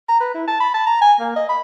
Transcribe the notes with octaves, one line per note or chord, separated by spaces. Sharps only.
A#5
B4
E4
A5
B5
A5
A#5
G#5
A#3
D#5
B5